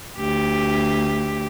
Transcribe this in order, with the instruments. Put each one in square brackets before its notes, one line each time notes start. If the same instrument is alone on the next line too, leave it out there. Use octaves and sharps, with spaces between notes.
[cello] D2 G4